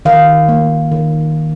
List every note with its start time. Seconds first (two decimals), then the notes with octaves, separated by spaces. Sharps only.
0.05 D#3 F5
0.49 A#3
0.92 D#3